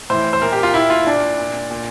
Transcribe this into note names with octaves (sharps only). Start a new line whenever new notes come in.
A2 E3 C5
C5
A#2 A#4
G4
F4
A#2 E4
F4
A#2 D4
A#2
A#2